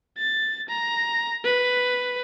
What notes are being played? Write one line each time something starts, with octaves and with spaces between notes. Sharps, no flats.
A6
A#5
B4